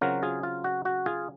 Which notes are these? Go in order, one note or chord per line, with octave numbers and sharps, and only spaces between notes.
C#3 F#3 C4 F4 F#4 A#4
F4 G#4
F4
F#4
F#4
F4 G#4